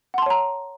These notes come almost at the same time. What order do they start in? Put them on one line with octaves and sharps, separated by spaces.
F#5 C6 A5 C#5 A#5